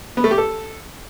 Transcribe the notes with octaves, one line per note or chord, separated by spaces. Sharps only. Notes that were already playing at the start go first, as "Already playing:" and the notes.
B3
A3
G4
A4